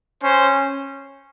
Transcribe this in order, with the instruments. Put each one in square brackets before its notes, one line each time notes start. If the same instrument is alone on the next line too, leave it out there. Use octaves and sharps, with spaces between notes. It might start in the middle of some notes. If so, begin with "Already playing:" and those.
[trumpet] C#4 [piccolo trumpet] C5